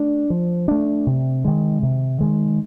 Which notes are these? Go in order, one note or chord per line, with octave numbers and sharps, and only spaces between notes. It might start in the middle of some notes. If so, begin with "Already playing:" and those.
Already playing: A3 D4
F3
A3 D4
C3
D#3 G#3
C3
D#3 G#3